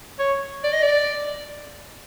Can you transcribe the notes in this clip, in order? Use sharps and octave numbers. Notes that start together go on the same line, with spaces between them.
C#5
D5
D#5
D5